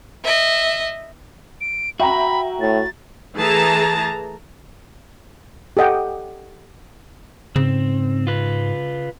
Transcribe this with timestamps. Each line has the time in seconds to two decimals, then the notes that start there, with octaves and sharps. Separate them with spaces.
0.24 D#5 E5
1.61 D7
2.00 F#4 E5 G5 A#5 B5
2.61 A2 A6
3.36 E3 A3 G#4 A5 A#5
5.77 G4 A4 D#5 F#5 G5
7.56 G#2 C#3 C4
8.27 F4 B4